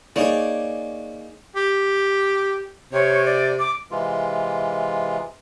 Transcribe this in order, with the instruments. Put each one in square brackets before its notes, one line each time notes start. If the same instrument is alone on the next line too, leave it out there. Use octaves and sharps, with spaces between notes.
[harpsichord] A#3 D#4 G#4 [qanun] C#5 D5
[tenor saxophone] G4
[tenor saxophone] C3 [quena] C#5
[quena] D5
D6
[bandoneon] C3 E3 G#3 F4